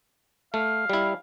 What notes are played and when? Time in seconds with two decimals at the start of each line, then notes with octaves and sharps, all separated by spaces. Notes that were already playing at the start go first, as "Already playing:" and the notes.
0.54 A3 F5
0.90 G3 E4